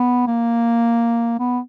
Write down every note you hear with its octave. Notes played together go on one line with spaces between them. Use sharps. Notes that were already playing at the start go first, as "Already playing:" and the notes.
Already playing: B3
A#3
B3